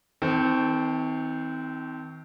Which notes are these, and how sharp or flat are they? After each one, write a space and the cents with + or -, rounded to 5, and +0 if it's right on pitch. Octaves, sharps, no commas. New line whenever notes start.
D#3 +35 C4 -15 A4 +0